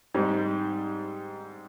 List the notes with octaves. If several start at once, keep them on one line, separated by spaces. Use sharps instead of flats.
G#2 G3 C4 D#4